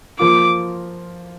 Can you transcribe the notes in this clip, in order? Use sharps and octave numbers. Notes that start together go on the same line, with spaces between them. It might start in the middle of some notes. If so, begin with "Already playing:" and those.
F3 A#3 F4 D6